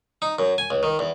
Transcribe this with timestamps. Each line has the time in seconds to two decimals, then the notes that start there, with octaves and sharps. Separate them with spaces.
0.22 D#4
0.39 F#2
0.58 G#5
0.70 C#2
0.83 D#3
0.99 E2